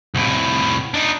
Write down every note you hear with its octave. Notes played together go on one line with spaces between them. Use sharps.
C2 A2
D4 D#4